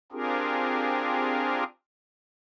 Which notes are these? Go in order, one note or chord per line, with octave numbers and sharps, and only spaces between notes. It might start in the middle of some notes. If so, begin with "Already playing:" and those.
C4 D4 F4 G4 G#4 A#4